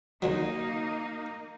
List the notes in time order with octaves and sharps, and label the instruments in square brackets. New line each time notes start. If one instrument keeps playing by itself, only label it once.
[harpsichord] C2 D3 F#3 [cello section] A#3 D#4